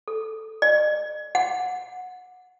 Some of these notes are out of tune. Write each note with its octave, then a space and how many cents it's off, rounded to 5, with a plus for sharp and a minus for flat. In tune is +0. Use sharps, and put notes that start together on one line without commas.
A4 +0
D#5 -45
F#5 -20